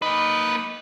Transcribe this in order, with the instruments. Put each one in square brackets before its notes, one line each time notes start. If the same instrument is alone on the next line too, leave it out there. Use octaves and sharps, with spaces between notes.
[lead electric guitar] A#3 B4 [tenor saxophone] D#4